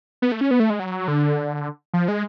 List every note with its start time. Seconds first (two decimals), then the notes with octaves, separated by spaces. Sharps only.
0.22 B3
0.32 A3
0.41 C#4
0.51 B3
0.60 A3
0.70 G#3
0.80 F#3
1.08 D3
1.94 F3
2.08 G#3